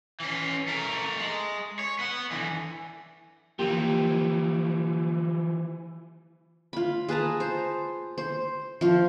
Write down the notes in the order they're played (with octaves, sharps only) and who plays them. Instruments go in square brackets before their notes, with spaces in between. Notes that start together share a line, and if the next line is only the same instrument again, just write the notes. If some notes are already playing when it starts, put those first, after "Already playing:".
[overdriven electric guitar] E3 C#4
A3 A#4
G#3
C#5
B3 F#5
D3 E3
[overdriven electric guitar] E3 F3 [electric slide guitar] A#3 G4
[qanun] F4 B5
G#4 B4 A5 A#5
C5
C5
F3 F4